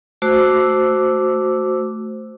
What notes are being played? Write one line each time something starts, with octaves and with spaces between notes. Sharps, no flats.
A3 F#4 C5 D6 E6